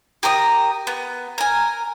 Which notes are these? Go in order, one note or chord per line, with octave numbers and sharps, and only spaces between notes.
G4 A#4 A#5 D#6
B3
A#4 G#5